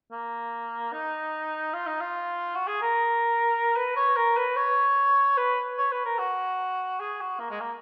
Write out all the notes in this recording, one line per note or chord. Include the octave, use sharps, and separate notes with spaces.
A#3
D#4
F4
D#4
F4
F#4
G#4
A#4
B4
C#5
A#4
B4
C#5
B4
C#5
B4
A#4
F#4
G#4
F#4
A#3
G#3
A#3